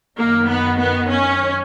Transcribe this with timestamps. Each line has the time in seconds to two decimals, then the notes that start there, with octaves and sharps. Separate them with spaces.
0.17 F#2 D#3 A#3
0.48 B3
0.79 B3
1.10 C#4